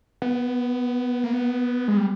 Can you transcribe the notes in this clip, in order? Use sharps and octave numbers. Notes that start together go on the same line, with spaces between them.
B3
A#3
B3
G#3
G3